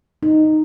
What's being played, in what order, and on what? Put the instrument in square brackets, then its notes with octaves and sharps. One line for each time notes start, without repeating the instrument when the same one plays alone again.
[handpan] D#4